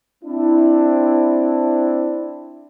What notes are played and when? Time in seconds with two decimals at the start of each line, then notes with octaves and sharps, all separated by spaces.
0.24 C4 D4 E4